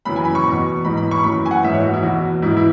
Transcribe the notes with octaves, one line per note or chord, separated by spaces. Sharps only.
F#2 C#3 E3 B5
G#5
B5
C#6
E2 B2
G#2 E3 B5
B5
C#6
F#2 E3 B5
G#5
F#5
G#2 E3 E5
C#5
F#4
E4
E2 B2 F#4
G#2 E3 E4
E4